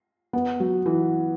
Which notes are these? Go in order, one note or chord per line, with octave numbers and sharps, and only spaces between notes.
B3
F#3
E3